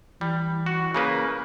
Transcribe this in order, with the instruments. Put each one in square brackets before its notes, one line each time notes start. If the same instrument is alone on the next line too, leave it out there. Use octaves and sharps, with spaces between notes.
[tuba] E3 [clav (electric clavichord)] G3
[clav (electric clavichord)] F#4
C#3 A#3 B4